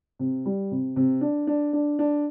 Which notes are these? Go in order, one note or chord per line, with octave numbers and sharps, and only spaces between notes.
C3
G3
C3
C3
D4
D4
D4
D4